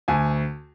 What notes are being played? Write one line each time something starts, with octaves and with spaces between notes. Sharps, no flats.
D2 G#5